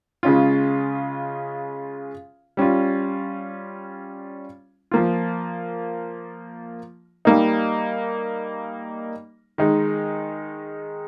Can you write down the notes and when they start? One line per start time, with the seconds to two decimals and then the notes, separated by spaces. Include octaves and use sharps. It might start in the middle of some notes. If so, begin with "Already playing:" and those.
0.23 C#3 G#3 C#4 F4
2.57 G3 C#4 F4
4.91 F3 A#3 F4
7.25 G3 A#3 D#4
9.58 D#3 G#3 D#4